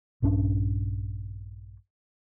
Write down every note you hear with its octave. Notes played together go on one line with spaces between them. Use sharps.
A#1 G2 C#4 D4